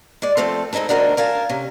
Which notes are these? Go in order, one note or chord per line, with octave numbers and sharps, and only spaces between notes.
G#3 D5
F3 A3 C4 A4
G#3 C4 D#4 E4 A4
D2 D4 F#4 A#4 D#5
A#4 F5 G#5 A5
C3 C#4